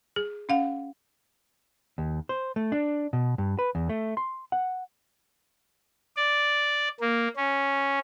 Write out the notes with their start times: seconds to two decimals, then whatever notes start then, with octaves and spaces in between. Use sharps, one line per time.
0.16 G#4
0.49 C#4 F5 F#5
1.98 D#2
2.29 C5
2.56 A3
2.72 D4
3.13 B2
3.38 G2
3.59 B4
3.75 E2
3.89 A3
4.17 C6
4.52 F#5
6.16 D5
7.01 A#3
7.37 C#4